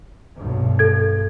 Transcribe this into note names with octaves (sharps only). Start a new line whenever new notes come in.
B1 G2
A4 G#6